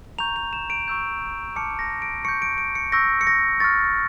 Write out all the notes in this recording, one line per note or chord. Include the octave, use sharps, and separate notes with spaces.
A#5 C#6 G6 F7
F7
E7
D7
C#6 E6 G6
A5 D6 F6 C#7
A#6
D7
C#6 G6 C#7
D7
D7
C#7
C#6 E6 G6 A#6
C#7
A#6
C#6 F6 A6